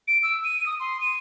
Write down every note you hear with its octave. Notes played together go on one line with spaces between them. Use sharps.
D7
E6
D#7
D#6
C6
D#7